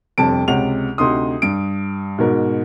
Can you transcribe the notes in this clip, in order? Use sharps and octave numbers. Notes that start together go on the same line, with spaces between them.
G1 F2 C3 A5 D7
C#2 C3 F#5 F7
D2 C3 D#4 C6 D#6
G2 D7
G#2 B2 A#4